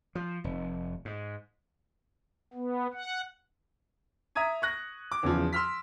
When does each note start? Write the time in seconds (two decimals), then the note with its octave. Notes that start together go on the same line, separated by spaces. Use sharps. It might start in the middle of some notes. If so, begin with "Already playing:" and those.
0.15 F3
0.44 F1
1.05 G#2
2.53 B3
2.94 F#5
4.35 E5 A#5 D#6 G#6 D#7
4.62 C#6 F#6 A#6
5.12 D6
5.23 E2 C#3 F3
5.53 C6 E6 F6 B6